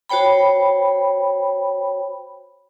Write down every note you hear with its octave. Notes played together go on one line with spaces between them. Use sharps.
F#4 C5 C#5 G5 B5